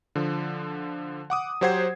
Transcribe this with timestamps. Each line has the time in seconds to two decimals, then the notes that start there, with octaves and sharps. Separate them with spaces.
0.15 D3 F3
1.30 F#5 D6 D#6
1.61 F#3 G4 C5 F#5 G#6 C7